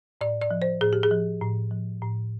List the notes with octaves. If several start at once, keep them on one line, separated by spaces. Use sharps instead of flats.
A2 D5
D5
F3
C5
A2 G#4
G4
G#4
F3
A2
F3
A2